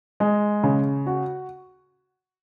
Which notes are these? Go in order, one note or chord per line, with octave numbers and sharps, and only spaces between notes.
G#3
C#3
F#4